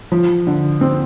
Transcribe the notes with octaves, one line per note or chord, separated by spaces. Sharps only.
F3
D3
C4